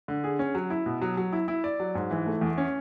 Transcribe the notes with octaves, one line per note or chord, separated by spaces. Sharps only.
D3
G#4
C#4
F#3
E4
B2
F#3
F#3
E4
E4
D5
F#3
G#2
E3
A3
E2
C#4